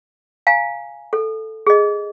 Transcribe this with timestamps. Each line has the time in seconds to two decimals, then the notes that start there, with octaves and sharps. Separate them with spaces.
0.47 F5 G#5 A#5
1.13 A4
1.67 G#4 D#5